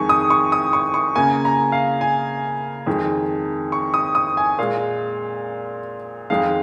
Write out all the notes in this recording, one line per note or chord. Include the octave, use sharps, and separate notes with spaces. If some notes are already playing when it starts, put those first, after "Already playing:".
Already playing: F2 D#3 G#3 G#5 C#6
D#6
C#6
D#6
C#6
C#6
C#3 A#3 G#5
A#5
F5
G#5
F2 D#3 G#3
C#6
D#6
D#6
G#5
A#2 G#3 F5
F2 D#3 G#3 F5